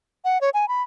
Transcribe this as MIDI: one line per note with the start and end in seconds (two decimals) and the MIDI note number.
0.25 0.41 78
0.41 0.50 73
0.54 0.68 80
0.68 0.83 83